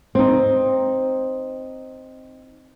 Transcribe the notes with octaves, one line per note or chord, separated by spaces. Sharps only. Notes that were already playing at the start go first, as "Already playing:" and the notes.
C4 D#4